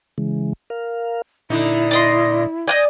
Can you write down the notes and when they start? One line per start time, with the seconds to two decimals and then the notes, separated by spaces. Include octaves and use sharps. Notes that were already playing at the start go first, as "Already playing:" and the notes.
0.18 C#3 E3 G#3
0.70 A#4 F5
1.50 A#2 D3 D#4 E4
1.91 D5 D#5 C6
2.68 D5 D#5 F#5 G#5 G6